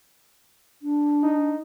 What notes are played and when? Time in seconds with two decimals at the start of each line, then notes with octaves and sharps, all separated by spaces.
0.82 D4
1.23 D#4